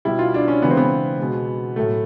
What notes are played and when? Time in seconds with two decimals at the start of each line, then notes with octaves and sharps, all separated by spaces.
0.05 B2 G3 E4
0.19 F4
0.34 D4
0.48 C#4
0.62 C#3 E3 G#3 B3
0.70 C4
0.77 B3
1.19 B2 G#3
1.76 A2 F#3 A3